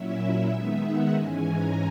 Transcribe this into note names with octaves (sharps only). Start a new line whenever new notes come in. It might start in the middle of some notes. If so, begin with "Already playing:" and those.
Already playing: A#2 F#3 C#4 E4 E5
D#3 G#3 B3 D#4 E5
F#5
G#2 E3 G#3 C#4 G#5
A#5